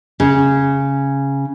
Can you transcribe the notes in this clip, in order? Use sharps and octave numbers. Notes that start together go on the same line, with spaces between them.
C#3